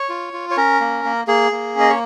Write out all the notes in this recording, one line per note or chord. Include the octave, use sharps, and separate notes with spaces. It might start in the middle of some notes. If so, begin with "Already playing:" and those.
Already playing: C#5
F4
F4
C#5
C#4 A#4
A#3
A#3
A#3 G#4
A#3
C#4 D#5
C#5